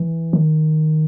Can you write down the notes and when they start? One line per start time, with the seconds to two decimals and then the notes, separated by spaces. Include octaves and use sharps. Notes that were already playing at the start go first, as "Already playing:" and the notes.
Already playing: E3
0.33 D#3